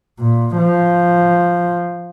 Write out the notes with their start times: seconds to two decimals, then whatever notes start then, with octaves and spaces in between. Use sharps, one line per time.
0.20 A#2
0.57 F3